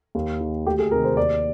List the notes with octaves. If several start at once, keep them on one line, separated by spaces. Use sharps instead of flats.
D#2
D#3
D2 G4
G#4
C3 D#3 A#4
C5
D#2 D5